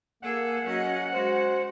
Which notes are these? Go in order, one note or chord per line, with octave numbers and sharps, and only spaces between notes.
A#3 G#4 A4 F#5
F#3 C#4 D#5
G#3 F#4 C5